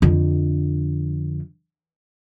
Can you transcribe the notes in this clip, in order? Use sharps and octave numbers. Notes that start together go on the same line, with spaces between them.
F2 D3